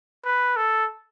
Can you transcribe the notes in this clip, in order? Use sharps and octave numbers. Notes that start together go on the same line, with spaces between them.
B4
A4